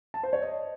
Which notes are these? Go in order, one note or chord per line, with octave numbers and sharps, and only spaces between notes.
A5
C5
C#5
D#5